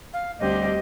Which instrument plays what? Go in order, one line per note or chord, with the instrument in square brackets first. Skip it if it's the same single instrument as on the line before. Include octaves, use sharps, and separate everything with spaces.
[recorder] F5
[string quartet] D2 D3 G3 C4 G4 [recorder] D#5